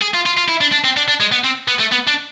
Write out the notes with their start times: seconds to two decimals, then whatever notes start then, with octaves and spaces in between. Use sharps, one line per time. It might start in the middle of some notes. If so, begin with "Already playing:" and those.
0.02 G#4
0.14 F4
0.26 F4
0.37 F4
0.49 E4
0.61 D4
0.72 D4
0.84 C4
0.97 D4
1.08 D4
1.20 G#3
1.32 B3
1.44 C4
1.68 B3
1.80 A3
1.92 B3
2.08 D4